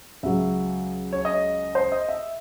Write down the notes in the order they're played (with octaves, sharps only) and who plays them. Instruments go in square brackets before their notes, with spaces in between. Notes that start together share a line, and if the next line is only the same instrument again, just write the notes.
[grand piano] C#2 C#3 F#3 E5
C#5
D#5
C5
D#5
E5